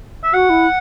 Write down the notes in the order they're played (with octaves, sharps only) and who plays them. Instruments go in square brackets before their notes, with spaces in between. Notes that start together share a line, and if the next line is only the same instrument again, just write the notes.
[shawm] E5
[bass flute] F#4 [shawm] F#5
[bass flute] E4